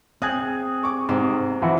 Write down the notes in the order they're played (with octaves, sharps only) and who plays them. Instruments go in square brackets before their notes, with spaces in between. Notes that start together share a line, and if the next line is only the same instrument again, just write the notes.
[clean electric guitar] C4 G#4 [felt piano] D#6 G#6 [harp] F#6
[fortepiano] C#6 D6
[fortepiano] G#2 [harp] C3
[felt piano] E3 F3 [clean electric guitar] E4 F#4